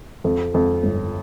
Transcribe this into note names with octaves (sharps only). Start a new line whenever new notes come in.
F2
F2
G1